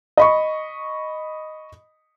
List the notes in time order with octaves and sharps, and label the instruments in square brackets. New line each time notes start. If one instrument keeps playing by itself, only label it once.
[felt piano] D#5 B5 C#6